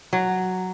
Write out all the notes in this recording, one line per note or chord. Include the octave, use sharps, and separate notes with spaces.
F#3